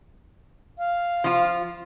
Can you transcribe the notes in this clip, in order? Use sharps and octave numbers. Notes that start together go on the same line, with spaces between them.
F5
F3 F4